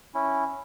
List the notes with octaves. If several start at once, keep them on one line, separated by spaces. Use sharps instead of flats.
C#4 E4